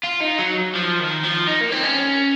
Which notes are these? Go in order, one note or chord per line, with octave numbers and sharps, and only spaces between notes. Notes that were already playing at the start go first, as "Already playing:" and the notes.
F4
D#4
F#3
F3
D#3
F3
D#4
A#3
C4
C#4